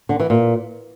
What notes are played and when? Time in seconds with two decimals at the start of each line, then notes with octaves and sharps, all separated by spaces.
0.09 D3
0.20 E3
0.30 A#2